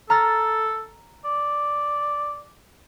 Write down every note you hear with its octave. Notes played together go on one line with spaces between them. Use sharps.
A4 A#5 F6 A6
D5